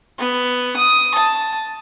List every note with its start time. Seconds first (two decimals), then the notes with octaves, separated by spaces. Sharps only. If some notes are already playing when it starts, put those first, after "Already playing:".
0.18 B3
0.76 D#6
1.14 A5